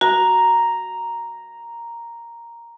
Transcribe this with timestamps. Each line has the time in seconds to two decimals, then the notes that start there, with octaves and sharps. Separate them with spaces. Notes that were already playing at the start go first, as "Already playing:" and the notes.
0.01 F#4 A#5